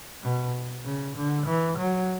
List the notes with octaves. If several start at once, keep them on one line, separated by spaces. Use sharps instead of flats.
B2
C#3
D3
E3
F#3